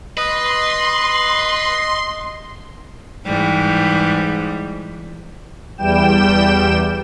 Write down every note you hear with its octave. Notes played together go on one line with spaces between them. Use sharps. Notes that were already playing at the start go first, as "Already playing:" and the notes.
B4 D#5 C6
G#2 E3 G3
E2 G3 G5 E7